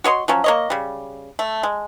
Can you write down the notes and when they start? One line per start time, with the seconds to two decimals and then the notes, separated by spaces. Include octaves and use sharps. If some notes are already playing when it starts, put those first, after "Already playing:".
0.04 F#4 C#5 D#5 C6
0.28 F3 F#3 C#4
0.44 A#3 C#5 D#5
0.70 C#3 G3
1.39 A3
1.63 G#3